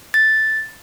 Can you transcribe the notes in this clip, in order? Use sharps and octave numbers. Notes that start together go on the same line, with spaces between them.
A6